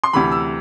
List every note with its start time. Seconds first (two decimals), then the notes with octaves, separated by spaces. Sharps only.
0.03 C6
0.13 D2 C3 E3 B5
0.32 E6